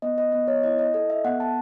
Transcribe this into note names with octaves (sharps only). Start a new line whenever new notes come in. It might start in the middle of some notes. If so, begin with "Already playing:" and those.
B3 D#5
D#5
B3 D#5
C#5
E4 D#5
D#5
A4 D#5
E5
B3 F#5
A5